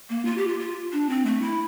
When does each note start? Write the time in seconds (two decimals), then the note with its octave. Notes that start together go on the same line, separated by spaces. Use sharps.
0.09 A#3
0.25 F4
0.37 G4
0.48 F4
0.59 F4
0.92 D4
1.09 C4
1.26 A3
1.42 E4